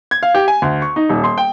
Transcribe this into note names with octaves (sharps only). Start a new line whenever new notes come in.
G#6
F5
G4
G#5
D2
C#6
D#4
D#1
C6
G5